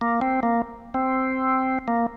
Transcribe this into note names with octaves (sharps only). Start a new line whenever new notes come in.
A#3
C4
A#3
C4
A#3